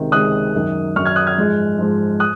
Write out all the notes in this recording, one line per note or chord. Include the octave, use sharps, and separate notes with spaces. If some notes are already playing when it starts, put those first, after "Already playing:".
Already playing: C#2 C3 D#3 G#3
C#2 C3 D#3 G#3 D#6 F#6
F#2 D#3 F#3
F#2 D#3 F#3 C#6 F6
F6 G#6
D#6 F#6
F6 G#6
G#2 F3 G#3
G#2 F3 G#3
D#6 F#6